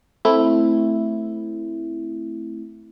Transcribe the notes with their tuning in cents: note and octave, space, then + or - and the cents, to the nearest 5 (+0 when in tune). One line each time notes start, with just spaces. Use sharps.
A3 +0 C4 +0 E4 +0